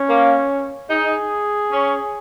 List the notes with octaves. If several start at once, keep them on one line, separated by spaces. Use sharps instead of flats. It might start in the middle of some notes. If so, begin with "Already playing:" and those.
Already playing: C#4
A#3
D#4 G#4
C#4